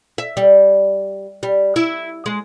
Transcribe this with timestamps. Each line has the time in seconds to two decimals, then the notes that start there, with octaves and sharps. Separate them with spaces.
0.18 E5
0.37 G3
1.43 G3
1.76 E4
2.26 G#3